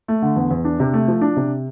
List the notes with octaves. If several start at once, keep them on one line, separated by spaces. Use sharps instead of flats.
A3
D3
E2
E2
D4
C3
A3
F3
D4
C3